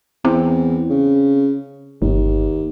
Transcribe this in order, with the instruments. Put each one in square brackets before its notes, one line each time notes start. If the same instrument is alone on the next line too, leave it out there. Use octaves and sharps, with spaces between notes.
[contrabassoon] E2 [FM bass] C4
[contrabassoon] C#3
[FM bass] G1 [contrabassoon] D#2